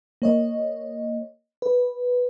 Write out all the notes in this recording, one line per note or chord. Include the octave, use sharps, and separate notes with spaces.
A#3 C#5 D#5
B4